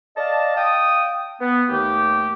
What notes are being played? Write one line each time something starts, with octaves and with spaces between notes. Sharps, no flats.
D5 D#5 F5 A5
F5 G5 D#6
B3
D#2 A3 G4